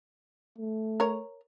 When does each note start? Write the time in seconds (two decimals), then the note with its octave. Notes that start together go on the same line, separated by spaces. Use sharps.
0.58 A3
1.00 A#4 C#5